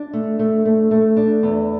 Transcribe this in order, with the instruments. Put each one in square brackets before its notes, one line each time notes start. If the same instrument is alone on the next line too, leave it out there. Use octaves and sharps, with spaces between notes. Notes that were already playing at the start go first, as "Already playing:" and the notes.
Already playing: [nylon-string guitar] D4
A3
A3
A3
A3
D4
E2